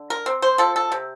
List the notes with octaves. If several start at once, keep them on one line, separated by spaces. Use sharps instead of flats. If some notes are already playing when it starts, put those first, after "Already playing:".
Already playing: D3
A#4
C4
C5
F3 A4
A4
C3